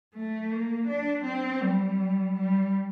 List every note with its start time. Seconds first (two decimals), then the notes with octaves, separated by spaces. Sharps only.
0.14 A3
0.50 A#3
0.87 D4
1.24 C4
1.61 G3
2.35 G3